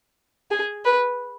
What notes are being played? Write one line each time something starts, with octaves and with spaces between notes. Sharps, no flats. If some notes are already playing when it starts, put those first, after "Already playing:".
G#4
B4